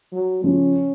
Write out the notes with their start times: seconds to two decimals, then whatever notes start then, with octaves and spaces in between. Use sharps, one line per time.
0.12 F#3
0.44 C#3 F3 C#4